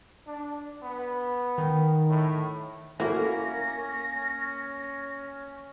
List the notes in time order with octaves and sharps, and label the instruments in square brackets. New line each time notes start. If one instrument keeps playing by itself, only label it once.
[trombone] D4
B3
[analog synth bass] D#3
[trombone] A2
[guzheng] A#3 [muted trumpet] C#4 [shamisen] E4 F#4 [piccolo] A#6